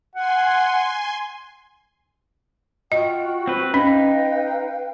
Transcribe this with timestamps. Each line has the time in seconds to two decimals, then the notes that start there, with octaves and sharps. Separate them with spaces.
0.15 F#5 G#5 C6
2.92 F4 F#4 D#5 G5
3.47 C4 B4
3.74 C#4 D#4 B4 F5 G5